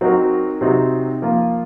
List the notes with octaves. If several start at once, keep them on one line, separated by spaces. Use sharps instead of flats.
F#3 C4 D#4 F#4 A#4
C3 F#3 C4 D#4
F3 A#3 F4